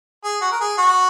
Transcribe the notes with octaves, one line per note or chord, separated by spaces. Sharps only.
G#4
F#4
A#4
G#4
F#4